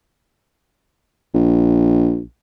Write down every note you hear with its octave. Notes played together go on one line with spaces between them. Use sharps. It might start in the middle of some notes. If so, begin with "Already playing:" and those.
A#1